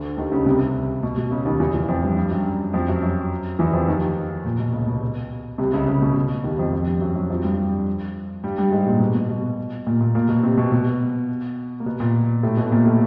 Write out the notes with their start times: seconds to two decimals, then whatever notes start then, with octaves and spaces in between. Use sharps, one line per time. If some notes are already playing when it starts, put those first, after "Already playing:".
Already playing: D2 D3
0.17 D#2 D#3
0.32 C#2 C#3
0.46 C2 C3
1.03 B2
1.18 B2
1.31 C#2 C#3
1.45 D#2 D#3
1.60 E2 E3
1.74 E2 E3
1.88 F2 F3
2.02 G2 G3
2.17 G2 G3
2.31 F#2 F#3
2.73 F2 F3
2.88 F#2 F#3
3.02 F#2 F#3
3.59 E2 E3
3.73 F2 F3
3.88 D#2 D#3
4.45 A#2
4.59 B2
4.73 C#2 C#3
4.87 B2
5.58 C2 C3
5.72 C#2 C#3
5.87 C#2 C#3
6.02 B2
6.16 B2
6.44 D#2 D#3
6.58 F2 F3
6.73 F2 F3
6.87 G2 G3
7.01 F#2 F#3
7.15 F#2 F#3
7.30 F2 F3
7.44 G2 G3
8.44 G2 G3
8.58 G2 G3
8.72 G#2 G#3
8.86 A#2 A#3
9.00 B2 B3
9.15 B2 B3
9.29 B2 B3
9.86 A#2 A#3
10.01 A#2 A#3
10.15 A#2 A#3
10.28 B2 B3
10.43 C3 C4
10.57 B2 B3
10.71 B2 B3
11.80 A#3
11.86 B2 B3
12.00 A#2 A#3
12.43 A2 A3
12.57 B2 B3
12.72 A#2 A#3
12.85 A2 A3